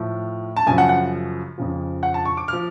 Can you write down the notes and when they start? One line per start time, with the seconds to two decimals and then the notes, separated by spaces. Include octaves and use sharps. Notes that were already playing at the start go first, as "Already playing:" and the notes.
Already playing: A2 F3
0.57 A5
0.66 F#2 C#3 F3 G#5
0.78 F#5
0.89 F#5
1.58 F2 C#3 F3
2.03 F#5
2.14 A5
2.25 C#6
2.37 D6
2.48 F6
2.53 F3